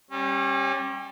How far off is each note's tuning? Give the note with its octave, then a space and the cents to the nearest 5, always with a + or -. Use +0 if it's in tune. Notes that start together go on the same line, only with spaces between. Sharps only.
G3 +0 C#4 -35